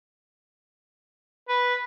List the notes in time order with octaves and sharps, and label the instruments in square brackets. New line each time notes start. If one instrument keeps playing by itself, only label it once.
[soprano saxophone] B4